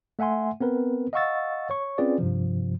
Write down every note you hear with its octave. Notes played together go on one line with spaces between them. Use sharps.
A3 E5 F#5 G#5 C6
B3 C4 A#4 B4
D#5 F5 F#5 C#6 E6 A6
C#5 C#6
C4 C#4 F4 G#4 B4 D5
G2 C3 F3